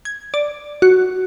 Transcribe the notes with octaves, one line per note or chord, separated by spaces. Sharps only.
G#6
D5
F#4